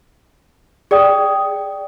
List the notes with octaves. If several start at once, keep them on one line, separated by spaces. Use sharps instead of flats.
G#4 D5 G5 D#6